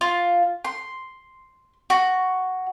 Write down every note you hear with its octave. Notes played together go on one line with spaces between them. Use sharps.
F4
C6
F#4